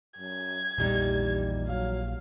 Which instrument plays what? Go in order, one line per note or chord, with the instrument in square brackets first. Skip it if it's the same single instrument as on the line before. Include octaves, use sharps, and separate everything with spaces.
[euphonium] F#2 [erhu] G#6
[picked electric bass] A#1 [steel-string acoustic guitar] E2 G3 D#4 [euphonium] G4
[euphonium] F#3 [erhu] F5